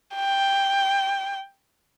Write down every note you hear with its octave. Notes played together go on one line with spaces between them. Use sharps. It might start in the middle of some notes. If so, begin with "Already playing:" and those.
G5